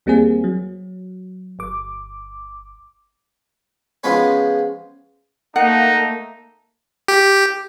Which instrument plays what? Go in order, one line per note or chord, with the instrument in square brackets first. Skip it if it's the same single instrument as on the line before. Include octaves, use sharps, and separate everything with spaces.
[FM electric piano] D#2 G3 A#3 C4 G#4
F#3
G1 D6
[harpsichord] F3 G#3 B3 C#4 B4
[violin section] A3 A#3 [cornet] D#4 [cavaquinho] F#5
[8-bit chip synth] G4